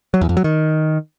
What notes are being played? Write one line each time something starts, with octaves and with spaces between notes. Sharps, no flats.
F#3
E2
F2
F#3
D#3